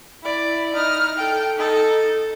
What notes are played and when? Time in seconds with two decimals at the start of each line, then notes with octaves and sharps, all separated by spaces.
0.23 E4 D5
0.74 D#4 F6
1.16 A4 G5
1.56 D#4 A4